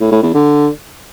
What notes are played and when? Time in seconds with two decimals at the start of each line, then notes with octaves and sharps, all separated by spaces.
0.01 A2
0.12 A2
0.23 E2
0.34 D3